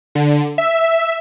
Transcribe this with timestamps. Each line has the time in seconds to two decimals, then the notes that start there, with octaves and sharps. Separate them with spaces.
0.15 D3
0.58 E5